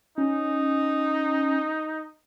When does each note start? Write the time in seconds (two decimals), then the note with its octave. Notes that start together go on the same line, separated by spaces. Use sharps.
0.18 C#4 D#4